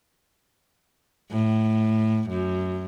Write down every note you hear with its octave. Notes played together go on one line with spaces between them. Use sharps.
A2
F#2